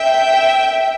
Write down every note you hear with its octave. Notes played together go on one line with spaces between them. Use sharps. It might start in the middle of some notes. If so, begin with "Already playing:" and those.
Already playing: E5 G5